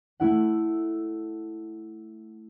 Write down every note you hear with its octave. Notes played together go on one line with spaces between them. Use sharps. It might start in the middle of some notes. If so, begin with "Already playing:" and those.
A3 E4 F#5